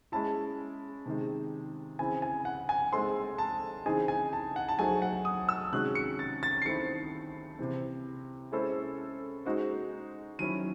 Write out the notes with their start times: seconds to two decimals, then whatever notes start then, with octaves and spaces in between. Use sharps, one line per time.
0.12 G#3 C#4 E4 A5
1.06 C3 D#3 G#3
1.99 C#3 E3 C4 E4 G#5
2.22 G#5
2.45 F#5
2.69 G#5
2.92 G#3 C4 D#4 A4 C5 C6
3.38 A5
3.86 C#3 E3 C4 D#4 G#4 G#5
4.08 G#5
4.33 A5
4.56 F#5
4.68 A5
4.79 F#3 A3 D#4 G#4 C5 G#5
5.02 F#5
5.25 D#6
5.49 E6
5.72 C3 D#3 G#3 C#4 F#4 F#6
5.95 C#7
6.19 A6
6.43 A6
6.62 C7
6.65 D#3 A3 C4 E4 C#7
7.59 C3 E3 C4
8.52 G#3 C#4 E4 A4 C5
9.45 G#3 D#4 F#4 C5
10.39 D#3 F#3 C#4 E4 D#7